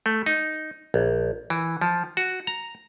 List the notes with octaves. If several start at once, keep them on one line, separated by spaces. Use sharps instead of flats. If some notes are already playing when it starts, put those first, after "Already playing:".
A3
D#4
A#1
E3
F3
F#4
A#5